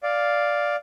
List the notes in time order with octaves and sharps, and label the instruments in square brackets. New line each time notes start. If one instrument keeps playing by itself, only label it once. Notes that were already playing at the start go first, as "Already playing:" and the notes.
[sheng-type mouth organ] D5 F5